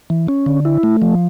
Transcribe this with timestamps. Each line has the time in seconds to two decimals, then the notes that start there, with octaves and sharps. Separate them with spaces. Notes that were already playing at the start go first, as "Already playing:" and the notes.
0.10 E3
0.29 C#4
0.46 D3
0.65 E4
0.83 A3
1.02 F3